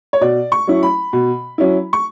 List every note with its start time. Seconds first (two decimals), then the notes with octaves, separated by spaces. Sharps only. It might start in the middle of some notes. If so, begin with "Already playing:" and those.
0.13 C#5
0.21 B2 D5
0.52 C#6
0.67 F#3 C#4 E4
0.83 B5
1.13 B2
1.58 F#3 C#4 E4
1.93 C#6